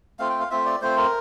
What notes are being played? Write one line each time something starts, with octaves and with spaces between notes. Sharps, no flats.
A3 C4 F4 F5
G5
F5
A3 C4 F4 E5
D5
A3 C4 F4 C5
A#4